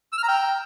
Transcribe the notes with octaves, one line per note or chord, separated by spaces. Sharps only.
E6
F6
A#5
G5